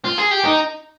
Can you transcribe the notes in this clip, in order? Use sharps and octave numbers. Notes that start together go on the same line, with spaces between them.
F4
G#4
G4
D#4